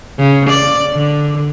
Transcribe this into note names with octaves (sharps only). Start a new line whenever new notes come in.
C#3
D5
D3